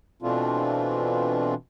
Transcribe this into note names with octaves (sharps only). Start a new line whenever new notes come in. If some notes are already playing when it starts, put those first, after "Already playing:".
B2 E3 A3 C4 D4 F4